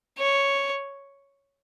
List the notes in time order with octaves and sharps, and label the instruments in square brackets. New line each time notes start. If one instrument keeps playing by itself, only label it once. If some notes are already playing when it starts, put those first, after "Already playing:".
[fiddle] C#5